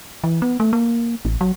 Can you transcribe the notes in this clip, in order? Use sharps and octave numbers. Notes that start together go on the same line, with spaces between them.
E3
B3
A3
A#3
A1
F#3